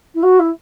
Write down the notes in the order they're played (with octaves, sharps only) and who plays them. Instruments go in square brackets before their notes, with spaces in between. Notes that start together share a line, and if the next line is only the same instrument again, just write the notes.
[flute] E4
F#4
E4